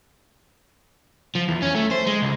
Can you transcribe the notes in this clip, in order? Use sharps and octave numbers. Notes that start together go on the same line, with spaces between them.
F3
E2
C#4
A3
C5
G#3
C#2